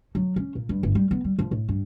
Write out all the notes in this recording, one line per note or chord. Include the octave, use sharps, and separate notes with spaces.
F#3
C#4
A#2
G2
G1
G3
B3
G3
F3
A2
G2